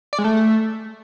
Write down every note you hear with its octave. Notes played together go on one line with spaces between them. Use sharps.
D5
G#3
A3